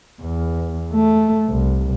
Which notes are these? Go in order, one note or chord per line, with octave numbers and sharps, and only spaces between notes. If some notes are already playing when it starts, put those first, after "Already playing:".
E2
A3
C2